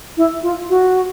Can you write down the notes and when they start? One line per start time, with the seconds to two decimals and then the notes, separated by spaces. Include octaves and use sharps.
0.17 E4
0.42 F4
0.69 F#4